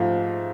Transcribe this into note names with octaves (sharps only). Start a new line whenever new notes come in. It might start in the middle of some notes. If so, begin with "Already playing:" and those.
Already playing: G#2 F3 A3 F5